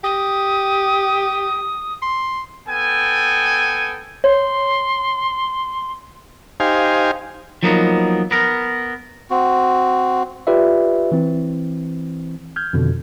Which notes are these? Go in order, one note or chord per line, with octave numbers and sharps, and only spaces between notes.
G4 D#6
C6
B3 A4 G5 G#5
C#5 C6
D#4 G4 C5 F5 G#5
F3 F#3 A#3 B3 D#4
B3 A#4
C4 F#4
F4 G4 B4 D5 E5
E3 C4
F6 G6 G#6
F2 B2 D3 D#3